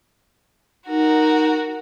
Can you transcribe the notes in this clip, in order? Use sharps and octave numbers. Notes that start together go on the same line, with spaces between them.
D#4 F#4 A#4